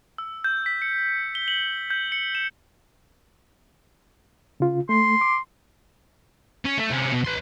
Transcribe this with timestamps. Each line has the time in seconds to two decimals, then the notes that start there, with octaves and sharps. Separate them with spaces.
0.18 E6
0.44 G6
0.66 B6
0.82 C#7
1.35 G7
1.48 F#7
1.90 G6
2.12 C#7
2.35 E7
4.60 C#3 F4
4.89 A3 C6
5.21 D6
6.65 C#4
6.78 A3
6.91 C3 C#4
7.12 B2
7.24 B4 C6